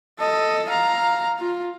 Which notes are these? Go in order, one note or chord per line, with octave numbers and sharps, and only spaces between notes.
A4 D#5
F5 A#5
F4